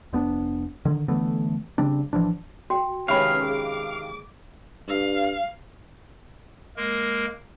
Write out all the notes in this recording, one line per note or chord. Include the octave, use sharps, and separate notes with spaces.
F1 B3 D4
D3 D#3
D3 E3 A3 B3
C#3 G3 C4 D4
A1 E3 F3 D4
F#4 G5
C3 D#3 G#3 C#4 B4 F5 B5 C#6
G#4 D6
G2 F5
G#3 A#3 A#4